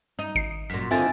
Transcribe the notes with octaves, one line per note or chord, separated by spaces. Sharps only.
D#4
G#1 C7
F#2 A#2 B6
D3 D#3 C4 D#4 F4 E5 G#5 A6